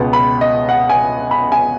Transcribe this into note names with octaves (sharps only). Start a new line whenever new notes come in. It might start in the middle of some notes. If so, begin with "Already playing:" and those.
Already playing: C#2 B2 B3
B5
D#5
F#5
G#5
B5
G#5